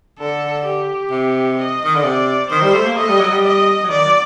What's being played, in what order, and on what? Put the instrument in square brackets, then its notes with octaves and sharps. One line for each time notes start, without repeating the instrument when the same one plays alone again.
[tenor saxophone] D3 [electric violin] A4
[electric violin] G4
[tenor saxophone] C3
[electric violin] D#5
[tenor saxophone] D#3
D3
[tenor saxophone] C3 [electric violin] D5
[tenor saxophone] D#3 [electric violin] C5
[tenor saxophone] G3
A3
A#3
[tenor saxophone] A3 [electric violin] D#5
[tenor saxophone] G3
F#3
G3
[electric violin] D#5
[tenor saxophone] F#3
[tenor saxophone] D#3 [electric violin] D5
[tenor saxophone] F#3